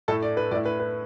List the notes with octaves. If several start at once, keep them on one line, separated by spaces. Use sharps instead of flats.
A2 A3 E4 A4 A5
D5
B4
A2 A3 E4 D5
B4
B4